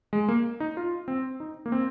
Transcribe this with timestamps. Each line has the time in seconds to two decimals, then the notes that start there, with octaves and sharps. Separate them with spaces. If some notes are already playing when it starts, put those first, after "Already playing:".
0.13 G#3
0.28 A#3
0.60 D#4
0.77 F4
1.08 C4
1.40 D#4
1.66 A#3
1.72 C4